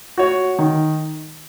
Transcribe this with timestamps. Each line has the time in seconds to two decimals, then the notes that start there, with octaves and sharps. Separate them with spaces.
0.18 F#4 C#5
0.59 D#3